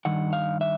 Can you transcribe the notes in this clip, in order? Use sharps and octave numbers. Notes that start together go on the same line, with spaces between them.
G2 D#3 F#5
F5
E5